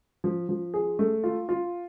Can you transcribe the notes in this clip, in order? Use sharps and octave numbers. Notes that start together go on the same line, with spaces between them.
F3
F3
G#4
A3
F4
F4